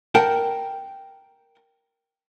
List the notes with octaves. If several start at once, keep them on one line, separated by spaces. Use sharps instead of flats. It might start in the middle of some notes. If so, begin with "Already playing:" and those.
A#4 F#5 G5 A5